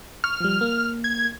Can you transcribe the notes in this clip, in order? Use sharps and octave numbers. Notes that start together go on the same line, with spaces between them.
C#6 F6
F3 G3
A#3
G#6